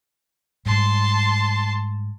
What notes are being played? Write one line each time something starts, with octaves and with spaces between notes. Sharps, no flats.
G#2 G3 A5 C6